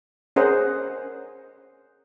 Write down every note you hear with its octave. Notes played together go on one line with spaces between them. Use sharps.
C#4 G#4 A#4 C5 D#5 F#5